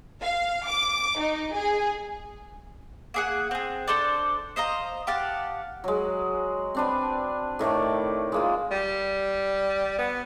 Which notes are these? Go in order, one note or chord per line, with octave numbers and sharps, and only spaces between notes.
F5
D6
D#4
G#4
A#3 G#4 F#5
C4 G#4
D4 A4 C5 D5
C5 D#5 F5 A#5
G4 F5 F#5 A5
F#3 G#3
C4 D4 B4
A2 D#3 A3 D5
G#3 A#3 F4
G3
B3